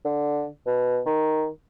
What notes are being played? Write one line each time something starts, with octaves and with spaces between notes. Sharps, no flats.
D3
B2
D#3